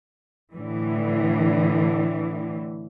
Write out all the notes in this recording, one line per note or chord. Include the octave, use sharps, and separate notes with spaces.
A2 D3 E3